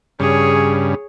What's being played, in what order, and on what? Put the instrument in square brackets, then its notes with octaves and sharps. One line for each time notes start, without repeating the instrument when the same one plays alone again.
[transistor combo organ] G2 C#3 [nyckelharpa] G#4 C#5